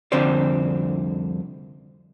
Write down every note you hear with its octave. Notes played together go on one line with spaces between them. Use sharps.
C2 F2 D3 C4 C5 D5